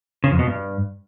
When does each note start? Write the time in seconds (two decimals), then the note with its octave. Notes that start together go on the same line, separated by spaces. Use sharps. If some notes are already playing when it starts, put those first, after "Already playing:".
0.24 C#3
0.31 F2
0.39 B2
0.47 G2